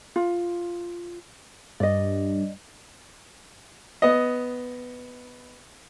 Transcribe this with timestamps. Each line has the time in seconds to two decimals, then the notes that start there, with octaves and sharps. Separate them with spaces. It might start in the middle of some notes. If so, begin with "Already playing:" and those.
0.16 F4
1.80 G2 D5 D#5
4.02 B3 D#5